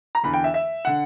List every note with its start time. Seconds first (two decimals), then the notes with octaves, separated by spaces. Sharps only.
0.15 A#5
0.23 E2 D3 B5
0.33 G5
0.44 E5
0.54 E5
0.85 D3 F#5